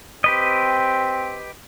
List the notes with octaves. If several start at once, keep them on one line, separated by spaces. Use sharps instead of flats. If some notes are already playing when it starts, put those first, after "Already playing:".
C4 G4 B4 D#5